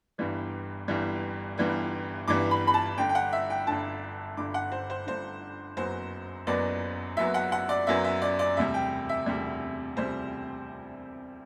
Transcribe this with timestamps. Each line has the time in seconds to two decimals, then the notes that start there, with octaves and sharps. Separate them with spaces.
0.18 G1 G2 E3 G3 B3
0.88 G1 G2 E3 G3 B3
1.58 G1 G2 E3 G3 B3
2.28 G1 G2 E3 G3 B3 D6
2.51 B5
2.67 B5
2.74 A5
2.97 G1 G2 D3 G5
3.09 G5
3.15 F#5
3.33 E5
3.50 G5
3.67 G1 G2 D3 A5
4.37 G1 G2 D3 D6
4.54 F#5
4.72 C5
4.90 C5
5.07 G1 G2 D3 C5
5.77 F#1 F#2 F#3 B3 C5
6.47 F#1 F#2 F#3 B3 D5
7.17 F#1 F#2 F#3 B3 E5
7.34 F#5
7.52 F#5
7.69 D5
7.87 F#1 F#2 F#3 B3 E5
8.05 E5
8.22 D5
8.39 D5
8.57 E1 D2 C3 G3 E5
8.74 G5
9.09 E5
9.26 E1 D2 C3 G3
9.97 E1 D2 C3 G3 C5